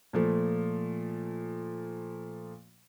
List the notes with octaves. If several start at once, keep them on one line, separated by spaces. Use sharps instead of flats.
A#2 F3 A3